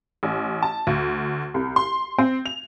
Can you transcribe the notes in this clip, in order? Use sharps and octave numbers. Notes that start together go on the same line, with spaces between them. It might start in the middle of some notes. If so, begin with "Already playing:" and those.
A1
A5
D2
C2
C6
C4
F7